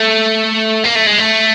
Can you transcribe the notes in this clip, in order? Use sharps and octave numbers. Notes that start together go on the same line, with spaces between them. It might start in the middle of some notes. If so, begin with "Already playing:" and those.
Already playing: A3
A#3
A3
G#3
A3